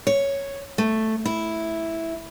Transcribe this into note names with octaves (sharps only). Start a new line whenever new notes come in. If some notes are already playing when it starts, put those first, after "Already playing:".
C#5
A3
E4